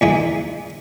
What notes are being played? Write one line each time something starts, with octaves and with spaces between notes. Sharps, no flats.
D#2 E3 G#3